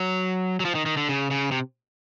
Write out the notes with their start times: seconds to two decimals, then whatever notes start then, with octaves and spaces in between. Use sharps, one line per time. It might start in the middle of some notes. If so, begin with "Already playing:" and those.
Already playing: F#3
0.60 F#3
0.65 F3
0.75 D#3
0.86 D#3
0.97 D3
1.09 C#3
1.31 C#3
1.52 C3